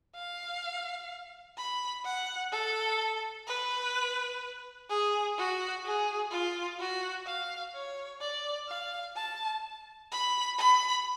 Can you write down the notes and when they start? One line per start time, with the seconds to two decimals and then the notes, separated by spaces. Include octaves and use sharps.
0.15 F5
1.57 B5
2.05 F#5
2.52 A4
3.47 B4
4.89 G#4
5.38 F#4
5.85 G#4
6.31 F4
6.79 F#4
7.26 F5
7.75 C#5
8.21 D5
8.68 F5
9.16 A5
10.12 B5
10.58 B5